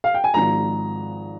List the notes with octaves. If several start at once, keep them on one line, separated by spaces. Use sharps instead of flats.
F5
G5
G#5
G#1 G#2 F3 A#5